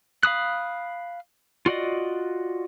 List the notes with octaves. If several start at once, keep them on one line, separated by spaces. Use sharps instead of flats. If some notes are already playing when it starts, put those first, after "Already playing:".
F5 B5 D#6 F#6
F4 F#4 D5 D#5